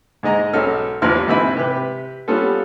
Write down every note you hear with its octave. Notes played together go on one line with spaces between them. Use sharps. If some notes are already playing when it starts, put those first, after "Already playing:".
G#2 G#3 D#5 A#5
B1 C#4 A4 F6
A1 E2 F3 E4 C6 F6
G#2 E3 C4 E4 G#5 B5
C3 G4 B4
G3 B3 C#4 F4 A4